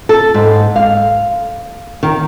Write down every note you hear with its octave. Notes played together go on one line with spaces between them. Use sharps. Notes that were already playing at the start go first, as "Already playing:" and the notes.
A4
G#2
F5
D#3